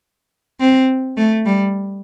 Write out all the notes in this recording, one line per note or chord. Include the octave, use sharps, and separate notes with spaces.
C4
A3
G3